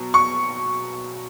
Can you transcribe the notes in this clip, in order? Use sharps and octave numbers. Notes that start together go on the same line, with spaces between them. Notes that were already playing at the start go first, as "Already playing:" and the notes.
Already playing: B2 F#3
C#6